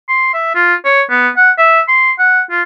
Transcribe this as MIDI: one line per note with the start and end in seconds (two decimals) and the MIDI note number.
0.09 0.29 84
0.33 0.50 76
0.55 0.74 65
0.85 1.02 73
1.10 1.28 59
1.37 1.50 78
1.58 1.81 76
1.88 2.11 84
2.19 2.41 78
2.51 2.62 65